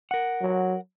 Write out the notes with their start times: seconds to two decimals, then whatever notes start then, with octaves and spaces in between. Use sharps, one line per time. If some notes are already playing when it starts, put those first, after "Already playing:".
0.11 A#4 F#5
0.41 F#3